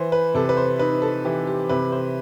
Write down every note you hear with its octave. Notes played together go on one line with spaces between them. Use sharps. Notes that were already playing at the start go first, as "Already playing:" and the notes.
Already playing: E3 C5
B4
C3 A4
B4
C5
D#4 B4
A4
E3 G4
G4
C3 B4
C5